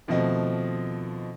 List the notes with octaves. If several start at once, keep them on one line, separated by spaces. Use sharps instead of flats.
D#2 B2 F3 A3 C4 D#4